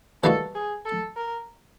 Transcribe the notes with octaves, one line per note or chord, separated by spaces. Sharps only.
E3 G3 A#3 D#4 F#4 A4
G#4
A4
A#4